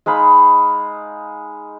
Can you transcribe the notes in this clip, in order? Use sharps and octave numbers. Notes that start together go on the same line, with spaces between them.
G#3 D#4 F5 B5